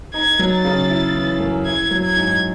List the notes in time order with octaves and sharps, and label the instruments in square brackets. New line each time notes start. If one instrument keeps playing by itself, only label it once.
[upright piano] D#4 [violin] G#6
[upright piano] F#3
[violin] A6
[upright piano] C#3
E4
E3
F#2
[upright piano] E4 [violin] G#6
[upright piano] F#3
[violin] G#6
[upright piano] G#2